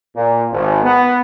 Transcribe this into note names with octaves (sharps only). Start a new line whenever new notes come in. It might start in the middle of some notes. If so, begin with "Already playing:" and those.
A#2
G#1
B3